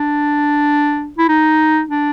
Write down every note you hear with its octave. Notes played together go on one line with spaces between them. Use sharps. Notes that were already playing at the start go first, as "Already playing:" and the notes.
Already playing: D4
E4
D#4
D4